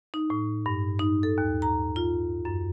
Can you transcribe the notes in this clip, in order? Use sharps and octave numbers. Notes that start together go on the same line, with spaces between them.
D#4
A2
G2
D#4
A4
D#2
A#5
F4
F#2